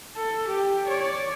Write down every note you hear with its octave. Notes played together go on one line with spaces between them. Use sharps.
A4
G4
C#5 D5